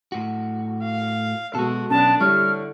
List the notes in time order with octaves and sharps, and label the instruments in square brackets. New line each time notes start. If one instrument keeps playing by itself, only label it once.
[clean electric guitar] A2 F#4
[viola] F5
[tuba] B2 [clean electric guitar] G#3 A4 [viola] F#4
[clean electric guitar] B1 [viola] B3 D4 [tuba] C#4 [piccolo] A5
[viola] D3 [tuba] G3 [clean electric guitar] E4 C#5 [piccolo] F6